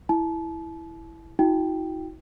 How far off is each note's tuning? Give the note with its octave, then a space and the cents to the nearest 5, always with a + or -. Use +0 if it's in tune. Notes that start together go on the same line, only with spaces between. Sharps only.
E4 +0 A5 -35
D#4 +45 F#4 -25 G5 +0